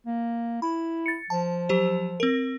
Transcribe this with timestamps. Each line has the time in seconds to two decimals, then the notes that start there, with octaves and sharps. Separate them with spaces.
0.06 A#3
0.62 E4 B5
1.06 A6 C#7
1.30 F3 A5
1.69 F#3 G4 C5
2.20 C4 A#4